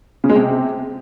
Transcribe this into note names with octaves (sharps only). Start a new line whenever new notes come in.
C#3
G#3
C3